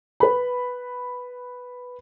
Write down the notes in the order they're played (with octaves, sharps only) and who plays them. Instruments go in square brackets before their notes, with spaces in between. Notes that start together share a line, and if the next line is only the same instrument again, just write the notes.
[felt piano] B4 B5